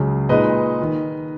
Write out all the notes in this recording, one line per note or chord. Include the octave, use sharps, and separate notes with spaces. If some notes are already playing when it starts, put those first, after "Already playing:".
Already playing: C#2 C#3 F#3
A#2 G#3 D#4 B4 D#5
D#3